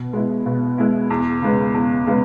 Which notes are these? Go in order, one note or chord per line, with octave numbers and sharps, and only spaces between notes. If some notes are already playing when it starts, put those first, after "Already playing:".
Already playing: B2
G#3 B3 E4
B2
G#3 B3 E4
E2
C#3 G#3 B3
E2
C#3 G#3 B3